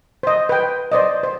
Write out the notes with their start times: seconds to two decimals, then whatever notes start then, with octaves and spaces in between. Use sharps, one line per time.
0.23 C5 D#5
0.49 B4 G5
0.92 C5 D5 D#5
1.23 C5